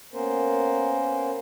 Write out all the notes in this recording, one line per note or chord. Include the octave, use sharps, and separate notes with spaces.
A#3 B3 C#4 A#4 C5